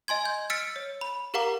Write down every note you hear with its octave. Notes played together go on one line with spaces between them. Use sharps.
D#5 G#5 C6 G#6
G6
E6 F6 A6 B6 C#7 D7
C#5
B5
G4 A#4 F5 F#5 A#5 D6